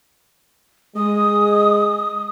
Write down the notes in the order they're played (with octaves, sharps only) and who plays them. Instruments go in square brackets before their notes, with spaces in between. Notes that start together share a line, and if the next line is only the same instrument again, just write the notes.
[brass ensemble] G#3 [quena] D#6